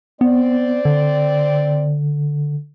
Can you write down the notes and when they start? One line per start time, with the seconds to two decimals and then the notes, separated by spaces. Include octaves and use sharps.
0.21 B3 C4 D5
0.85 D3